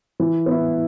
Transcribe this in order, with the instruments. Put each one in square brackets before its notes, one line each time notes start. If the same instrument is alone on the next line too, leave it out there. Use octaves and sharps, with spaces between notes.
[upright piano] E3
B3 E4